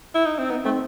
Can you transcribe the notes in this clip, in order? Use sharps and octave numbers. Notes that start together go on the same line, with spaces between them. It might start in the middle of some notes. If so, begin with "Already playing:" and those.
E4
D#4
C4
B3 D#4
A3 C4